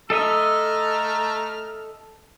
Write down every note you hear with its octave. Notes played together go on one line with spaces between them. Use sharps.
A3 A4 D#5 E5 A#5 F6